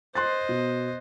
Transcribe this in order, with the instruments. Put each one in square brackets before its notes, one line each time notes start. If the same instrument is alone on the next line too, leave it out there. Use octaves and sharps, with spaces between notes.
[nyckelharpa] C5 D#5 [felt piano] C6 F#6 A6
[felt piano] B2